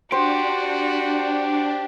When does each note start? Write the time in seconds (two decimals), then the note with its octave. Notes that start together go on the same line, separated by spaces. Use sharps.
0.12 D4 F#4 G4 C5